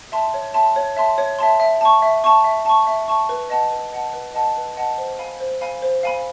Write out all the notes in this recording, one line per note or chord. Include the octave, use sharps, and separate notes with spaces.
E5 A5 C6
C#5
E5 A5 C6
C#5
E5 A5 C6
C#5
E5 A5 C6
E5
A5 C#6
E5
A5 C#6
E5
A5 C#6
E5
A5 C#6
B4
D#5 F#5 A5
B4
D#5 F#5 A5
B4
D#5 F#5 A5
B4
D#5 F#5 A5
C5
F5 G#5 B5
C5
F5 G#5 B5
C5
F5 G#5 B5